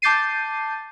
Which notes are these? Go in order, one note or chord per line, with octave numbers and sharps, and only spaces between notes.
A5 D6 G6 A6 C7 D#7